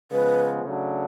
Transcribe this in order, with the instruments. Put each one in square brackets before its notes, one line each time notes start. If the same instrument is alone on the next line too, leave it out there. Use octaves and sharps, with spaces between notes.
[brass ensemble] C#3 F3 G#3 B3 [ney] B4
[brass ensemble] C#3 F#3 A3 D4